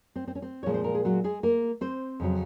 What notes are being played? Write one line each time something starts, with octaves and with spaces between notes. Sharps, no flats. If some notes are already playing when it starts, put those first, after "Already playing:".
C4
C4
C#4
C4
A#2 F3 G#3 C#5
C5
A#4
G#4
F#3 F#4
G#3 G#4
A#3 A#4
C4 C5
F2 C#3 F#3